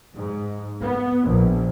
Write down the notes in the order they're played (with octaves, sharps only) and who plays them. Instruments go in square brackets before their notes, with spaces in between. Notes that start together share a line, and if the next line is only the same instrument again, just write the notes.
[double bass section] G#2
B3
A#1